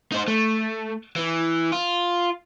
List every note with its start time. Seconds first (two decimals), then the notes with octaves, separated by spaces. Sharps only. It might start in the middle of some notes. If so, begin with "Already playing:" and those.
0.12 D#4 C5
0.28 A3
1.16 E3
1.72 F4